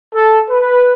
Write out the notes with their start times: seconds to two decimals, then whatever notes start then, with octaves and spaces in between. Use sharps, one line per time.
0.15 A4
0.51 B4